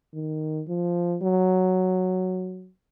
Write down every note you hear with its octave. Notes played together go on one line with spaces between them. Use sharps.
D#3
F3
F#3